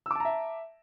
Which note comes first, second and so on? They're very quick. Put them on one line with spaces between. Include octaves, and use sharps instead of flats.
E6 D6 A5 A#5 E5